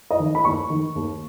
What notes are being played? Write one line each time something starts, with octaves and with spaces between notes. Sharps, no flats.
D#5
D#3
B5
D#2 C#6
D#3
D#2